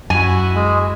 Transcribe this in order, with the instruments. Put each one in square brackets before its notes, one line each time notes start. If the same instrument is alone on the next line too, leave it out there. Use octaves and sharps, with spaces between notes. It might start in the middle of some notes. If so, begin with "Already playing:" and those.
[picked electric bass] F#2 [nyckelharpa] E4 F#4 [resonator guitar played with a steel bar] G#5
[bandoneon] G#3